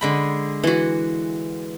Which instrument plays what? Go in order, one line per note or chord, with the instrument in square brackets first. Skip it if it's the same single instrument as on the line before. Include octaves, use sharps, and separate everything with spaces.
[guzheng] D3 G#3 B5
[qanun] E3 F#4